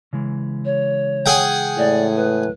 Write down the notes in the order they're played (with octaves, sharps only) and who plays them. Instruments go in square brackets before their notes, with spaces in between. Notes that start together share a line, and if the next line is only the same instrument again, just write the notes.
[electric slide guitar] C#3 E3 G#3
[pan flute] C#5
[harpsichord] G#4 F#5 G5
[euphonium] A2 [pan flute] D5
[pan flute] B4